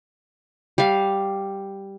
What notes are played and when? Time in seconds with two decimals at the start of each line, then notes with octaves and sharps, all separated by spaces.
0.78 G3 F5